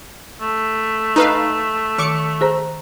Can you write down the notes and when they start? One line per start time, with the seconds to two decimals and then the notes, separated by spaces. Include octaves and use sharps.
0.41 A3
1.16 D#4 B4 F5 A#5
1.98 D#3 C#6 D6 C#7
2.41 G#4 C5 A#5